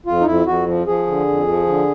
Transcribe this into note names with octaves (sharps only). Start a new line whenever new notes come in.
F2 F4
D#4
F2 E4
F2 F#4
F3
F3 G#4
D3
F2
F3
D3